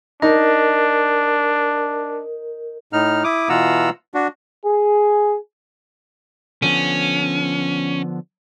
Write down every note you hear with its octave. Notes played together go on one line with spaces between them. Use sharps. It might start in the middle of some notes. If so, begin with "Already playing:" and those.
D4 D#4 A#4
A2 D#4 F6
E4 D6 D#6
B2 E3 F4 F#5 A#5 E6
D4 F#4
G#4
D3 F3 B3 C#4